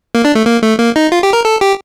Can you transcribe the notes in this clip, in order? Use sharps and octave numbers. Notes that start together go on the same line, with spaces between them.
A#3
D4
A3
A#3
A3
A#3
D#4
F4
G4
A#4
A4
G4